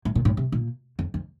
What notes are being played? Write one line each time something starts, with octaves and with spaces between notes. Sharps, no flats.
A2
A#2
A2
C3
A#2
F2
F2